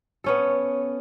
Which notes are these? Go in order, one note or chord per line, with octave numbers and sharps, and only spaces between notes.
B3 C#4 A4